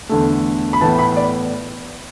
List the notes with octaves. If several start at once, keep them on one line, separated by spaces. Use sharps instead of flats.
E2 D3 A3
B5
A2 E3 B3 A5
B5
D5